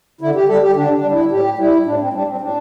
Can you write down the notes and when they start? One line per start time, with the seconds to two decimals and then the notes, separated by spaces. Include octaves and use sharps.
0.21 D3 E4
0.35 G4
0.48 G3 A4
0.62 G4
0.76 D3 D4
0.94 D4
1.03 G3
1.12 E4
1.31 A2 G4
1.58 G3 E4
1.86 A2 D4
1.99 C4
2.13 G3 D4
2.27 C4
2.41 A2 D4